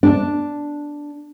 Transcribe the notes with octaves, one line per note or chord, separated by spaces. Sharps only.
D4